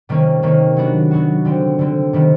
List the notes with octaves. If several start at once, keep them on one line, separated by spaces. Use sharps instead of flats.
C3 D#3 G3 A#3 C#4
C3 D#3 G3 A#3 C#4
F#3 B3 D4 F#4
F#3 B3 D4 F#4
D3 G3 C4
D3 G3 C4
C3 D#3 G3 B3